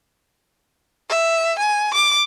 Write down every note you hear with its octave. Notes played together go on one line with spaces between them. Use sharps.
E5
G#5
D6